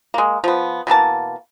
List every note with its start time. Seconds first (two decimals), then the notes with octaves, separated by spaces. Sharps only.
0.14 G#3 A#3
0.44 F3 B3
0.87 B2 E3 A#3 A5